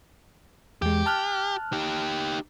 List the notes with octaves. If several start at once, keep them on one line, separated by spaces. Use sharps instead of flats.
E2 G#3 G4
A5 F6 F#6
D#4 G4